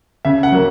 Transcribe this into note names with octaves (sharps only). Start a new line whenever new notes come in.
C#3 E5
F#5
F#3 A#3